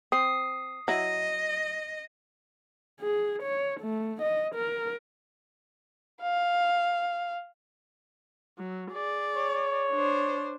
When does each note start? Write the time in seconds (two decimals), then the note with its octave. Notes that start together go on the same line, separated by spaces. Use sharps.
0.12 C4 D#6 C7
0.88 F#3 E4 D#5
3.01 G#4
3.43 C#5
3.80 A3
4.22 D#5
4.55 A#4
6.22 F5
8.58 F#3
8.92 G#4 D5
9.36 C#5
9.92 D4 C5